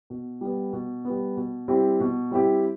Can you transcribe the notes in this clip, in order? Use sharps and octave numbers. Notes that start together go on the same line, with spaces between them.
B2
G3 B3
B2
G3 B3
B2
G3 C4 E4 G4
B2
G3 C4 E4 G4